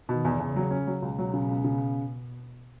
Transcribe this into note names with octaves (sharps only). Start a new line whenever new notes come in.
B2 D#3
E2
E2 C#3
F#3
C#4
F#3
C#2 B2
F#3
C#3
C#2
C#3